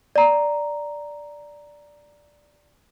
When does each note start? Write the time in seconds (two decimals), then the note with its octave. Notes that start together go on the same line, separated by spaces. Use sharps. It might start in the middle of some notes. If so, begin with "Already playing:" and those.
0.16 D5 A#5